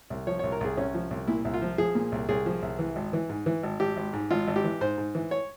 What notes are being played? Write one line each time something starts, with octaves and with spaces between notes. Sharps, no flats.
C2
F3 C#5
C2 C#5
A#4
C2 G#4
C2 C#4
F3
C2
A#2 E4
C2
F4
F3
F3 G#4
A#2
C2
C2 G#4
F3
C2
E3
G#1
E3
G#2
E3
G#1
G#1 G4
G#1
G#2
G#1 F4
G#1
G4
E3
G#2 C5
G#2
E3
C#5